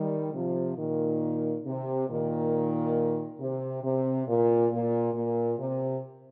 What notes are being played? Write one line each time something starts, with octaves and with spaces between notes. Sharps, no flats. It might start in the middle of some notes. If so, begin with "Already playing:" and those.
Already playing: D#3 G3
C3 F3
A#2 D#3
C3
A#2 D#3
C3
C3
A#2
A#2
A#2
C3